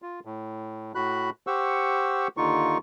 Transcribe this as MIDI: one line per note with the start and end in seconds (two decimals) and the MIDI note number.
0.02 0.20 65
0.25 0.92 45
0.95 1.30 45
0.95 1.30 66
0.95 1.30 83
0.95 1.30 90
1.47 2.28 67
1.47 2.28 72
1.47 2.28 78
1.47 2.28 85
1.47 2.28 88
2.37 2.78 39
2.37 2.78 50
2.37 2.78 63
2.37 2.78 65
2.37 2.78 85